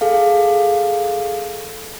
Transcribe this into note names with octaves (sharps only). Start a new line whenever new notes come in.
G#4 A4 F5